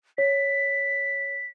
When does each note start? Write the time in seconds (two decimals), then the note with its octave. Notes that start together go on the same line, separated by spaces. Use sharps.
0.18 C#5 B6